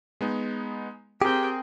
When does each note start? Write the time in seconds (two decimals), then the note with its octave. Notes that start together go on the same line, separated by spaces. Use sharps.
0.21 G#3 B3 D#4
1.22 C4 G4 G#4 A#4 G5